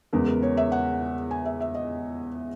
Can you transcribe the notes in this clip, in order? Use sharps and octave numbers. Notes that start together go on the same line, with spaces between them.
E2 C#3 G#3 B3 A#4
A#4
C#5
E5
F#5
G#5
E5
E5
D#5